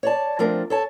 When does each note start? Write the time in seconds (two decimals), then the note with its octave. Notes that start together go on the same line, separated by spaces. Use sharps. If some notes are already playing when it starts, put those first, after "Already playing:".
0.03 C#5 D5 A5
0.39 F3 A3 C4 D4 A#4
0.70 A4 C#5 A5